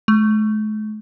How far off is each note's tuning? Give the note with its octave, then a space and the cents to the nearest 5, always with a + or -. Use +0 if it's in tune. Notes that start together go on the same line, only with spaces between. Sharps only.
A3 -45